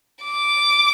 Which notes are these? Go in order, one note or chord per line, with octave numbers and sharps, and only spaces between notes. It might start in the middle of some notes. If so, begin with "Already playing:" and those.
D6